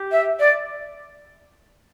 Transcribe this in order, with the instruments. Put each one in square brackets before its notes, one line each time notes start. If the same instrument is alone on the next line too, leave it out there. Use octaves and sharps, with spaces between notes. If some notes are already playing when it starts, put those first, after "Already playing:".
Already playing: [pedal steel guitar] G4
[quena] E5
D5